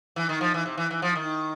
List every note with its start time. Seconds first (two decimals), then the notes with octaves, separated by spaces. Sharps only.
0.16 E3
0.29 D#3
0.41 F3
0.54 E3
0.66 C3
0.78 E3
0.91 E3
1.02 F3
1.15 D#3